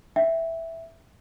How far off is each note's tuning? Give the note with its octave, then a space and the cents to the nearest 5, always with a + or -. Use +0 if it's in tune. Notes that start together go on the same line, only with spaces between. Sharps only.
E5 +0 G5 -5